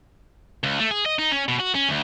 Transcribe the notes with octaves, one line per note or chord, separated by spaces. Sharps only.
C#2
A3
G#4
D#5
D#4
C#4
B2
F#4
C#4
D2